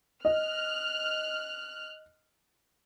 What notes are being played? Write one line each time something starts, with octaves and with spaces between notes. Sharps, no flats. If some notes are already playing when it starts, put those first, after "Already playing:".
D#5 F6 F#6